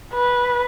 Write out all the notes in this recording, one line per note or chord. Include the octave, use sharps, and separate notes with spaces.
B4